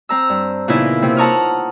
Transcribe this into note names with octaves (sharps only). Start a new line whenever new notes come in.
C4 A#5 E6
G2
A#2 C#3 E3 B3 D#4 E4
C3 A#3 C4
F#5 A5 A#5 C#6 D#6 F6